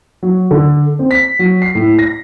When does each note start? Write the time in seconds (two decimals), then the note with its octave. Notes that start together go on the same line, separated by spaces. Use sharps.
0.23 F#3
0.51 D3
0.99 C4
1.11 B6
1.39 F#3
1.62 C7
1.75 A2
1.99 A#6